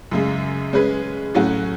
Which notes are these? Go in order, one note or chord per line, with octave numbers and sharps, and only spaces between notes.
F#2 C#3 G#3
G#3 C#4 G#4 B4
A2 F#3 C#4 F#4